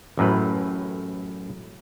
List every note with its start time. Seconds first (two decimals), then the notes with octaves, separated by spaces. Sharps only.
0.17 A1 F#2 A2 B4